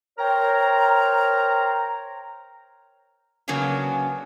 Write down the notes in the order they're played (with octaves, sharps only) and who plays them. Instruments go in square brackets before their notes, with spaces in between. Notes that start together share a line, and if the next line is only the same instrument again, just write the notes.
[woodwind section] A#4 C5 C#5 G5 A#5
[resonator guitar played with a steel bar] C#3 F#3 A#3 B3 C#4 D4